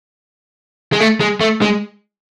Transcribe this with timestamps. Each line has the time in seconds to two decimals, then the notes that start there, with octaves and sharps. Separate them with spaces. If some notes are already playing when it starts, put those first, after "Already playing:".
0.93 G#3
1.01 A3
1.21 G#3
1.41 A3
1.62 G#3